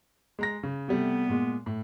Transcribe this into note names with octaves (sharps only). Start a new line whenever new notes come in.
G#3 A#5 A#6
C#3
C3 G3 A3 B3
A#2 G#3
A2